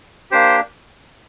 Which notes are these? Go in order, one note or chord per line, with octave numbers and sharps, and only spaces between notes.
A#3 D4 G4 C5